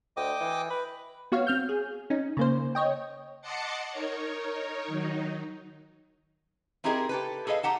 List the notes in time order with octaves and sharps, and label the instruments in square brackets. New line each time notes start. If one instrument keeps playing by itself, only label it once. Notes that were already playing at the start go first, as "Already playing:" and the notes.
[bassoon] D2 [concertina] D#5 G5 D6
[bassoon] E3
B4
[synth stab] B3 F#4 C#5 F5
C4 F6 G6
G#4
C#4 D#4
C#3 A#3 C5
C#5 D#5 G5
[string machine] D#5 F#5 A5 C6 D6 C#7
D#4 A#4 C#5
D#3 F#3 D#4
[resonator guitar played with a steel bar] C4 D#4 E4 G4 G#4 A#4
G4 A4 B4
G#4 A4 B4 D#5 F5
D#4 G4 F#5 A5